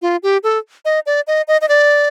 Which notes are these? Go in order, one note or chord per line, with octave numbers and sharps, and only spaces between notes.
F4
G4
A4
D#5
D5
D#5
D#5
D#5
D5